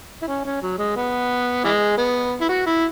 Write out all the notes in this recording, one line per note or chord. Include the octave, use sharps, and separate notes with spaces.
E4
C#4
C#4
F#3
G#3
B3
E3 G#3
B3
E4
F#4
E4